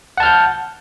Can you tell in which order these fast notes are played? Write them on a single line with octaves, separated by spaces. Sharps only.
F#5 A5 F6 G6